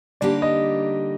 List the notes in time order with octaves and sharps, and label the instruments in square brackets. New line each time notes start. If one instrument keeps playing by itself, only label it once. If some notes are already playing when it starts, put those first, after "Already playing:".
[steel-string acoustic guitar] D3 G3 A#3 D#4 G4 [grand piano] D5
[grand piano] D#5